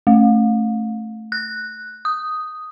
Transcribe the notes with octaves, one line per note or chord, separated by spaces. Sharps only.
A3
F#6
D#6